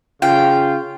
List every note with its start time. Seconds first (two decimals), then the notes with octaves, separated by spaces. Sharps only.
0.22 C#3 F4 G5